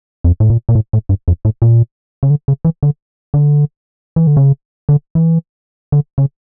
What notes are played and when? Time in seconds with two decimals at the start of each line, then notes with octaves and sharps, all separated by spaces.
0.24 F2
0.40 A2
0.50 A#2
0.69 A#2
0.75 A2
0.93 A2
1.09 G2
1.28 F2
1.45 A2
1.62 A#2
2.23 C#3
2.30 D3
2.48 C#3
2.65 E3
2.83 D3
3.34 D3
4.16 E3
4.27 D3
4.37 C#3
4.89 D3
5.15 E3
5.92 D3
6.18 C#3